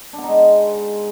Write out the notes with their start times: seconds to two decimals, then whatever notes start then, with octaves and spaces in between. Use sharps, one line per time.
0.13 D4
0.18 B3
0.23 D#4
0.28 G#3
0.34 C5